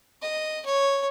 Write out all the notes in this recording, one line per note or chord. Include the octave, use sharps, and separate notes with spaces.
D#5
C#5